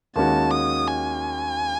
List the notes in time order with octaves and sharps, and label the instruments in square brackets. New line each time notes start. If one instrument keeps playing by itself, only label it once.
[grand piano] D#2 D#3 G#3 C#4 F#4 [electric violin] A5
[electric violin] D#6
G#5